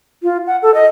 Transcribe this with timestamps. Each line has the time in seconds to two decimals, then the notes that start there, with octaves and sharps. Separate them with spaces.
0.23 F4
0.47 F#5
0.63 A4
0.74 D#5